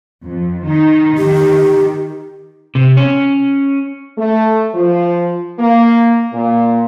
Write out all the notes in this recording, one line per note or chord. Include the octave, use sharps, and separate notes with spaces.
F2
D#3 D#4
D#3 G4
C3
C#4
A3
F3
A#3
A#2